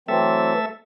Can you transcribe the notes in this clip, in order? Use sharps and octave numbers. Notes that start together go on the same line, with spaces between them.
E3 F#3 A3 C4 A4 E5